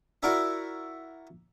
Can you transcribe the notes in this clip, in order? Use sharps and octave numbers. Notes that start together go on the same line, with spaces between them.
E4 F#4 A#4 D5 E5 A#5